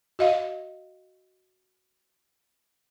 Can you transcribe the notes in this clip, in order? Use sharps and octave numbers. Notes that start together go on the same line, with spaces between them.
F#4 D#5 F5